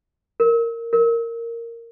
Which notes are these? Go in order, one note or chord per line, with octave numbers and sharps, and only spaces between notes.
A#4
A#4